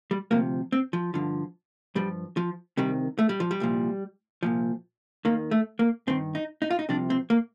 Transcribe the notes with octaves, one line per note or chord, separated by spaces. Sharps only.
G3
D2 C3 F3 A#3
C4
F3
G2 D3 F3
G2 F3 G3
F3
C2 C3 D#3 G3
A3
G3
F3
G3
C2 A#2 F3
C2 A#2 F3
D#2 D#3 A#3
A3
A#3
G2 D#3 C4
D#4
D#4
F4
D#4
C2 C3 F3 D4
C4
A#3